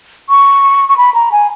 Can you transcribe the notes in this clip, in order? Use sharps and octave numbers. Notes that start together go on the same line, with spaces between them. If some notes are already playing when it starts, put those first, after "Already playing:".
C#6
C#6
B5
A#5
G#5